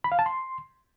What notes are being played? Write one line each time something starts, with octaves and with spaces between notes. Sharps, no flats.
B5
F5
A5
C6